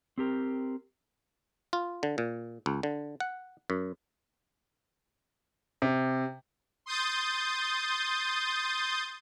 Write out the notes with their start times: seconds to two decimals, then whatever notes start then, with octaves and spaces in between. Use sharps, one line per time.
0.18 C4 G4 A#4
1.73 F4
2.03 D3
2.18 A#2
2.66 C#2
2.83 D3
3.20 F#5
3.70 F#2
5.82 C3
6.86 C6 D#6 G6 A6